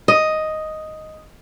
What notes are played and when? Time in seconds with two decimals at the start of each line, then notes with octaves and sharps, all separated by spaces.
0.08 D#5